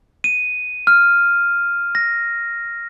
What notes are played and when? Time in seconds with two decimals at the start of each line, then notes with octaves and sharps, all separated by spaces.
0.24 D#7
0.87 F6
1.95 A#6